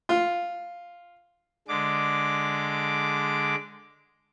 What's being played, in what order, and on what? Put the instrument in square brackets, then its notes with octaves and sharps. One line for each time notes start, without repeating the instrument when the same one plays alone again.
[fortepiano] F4
[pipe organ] D3 G#3 D6